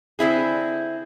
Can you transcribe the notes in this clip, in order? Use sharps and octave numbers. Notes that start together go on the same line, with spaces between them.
D3 C4 E4 G#4